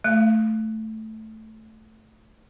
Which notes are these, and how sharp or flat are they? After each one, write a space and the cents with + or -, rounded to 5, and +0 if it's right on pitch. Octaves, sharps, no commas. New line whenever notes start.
A3 +0 E5 +45